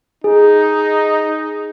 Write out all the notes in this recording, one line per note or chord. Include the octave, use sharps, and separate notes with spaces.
D#4 G#4